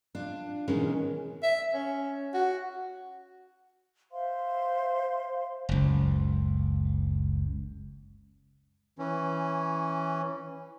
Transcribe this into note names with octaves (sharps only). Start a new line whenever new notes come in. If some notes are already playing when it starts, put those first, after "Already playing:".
D4 F4
B2 D#3 E3 G#3 C#4
E5
C#4
F#4
C5 E5 F5 C6
F#1 C#2
E3 C#4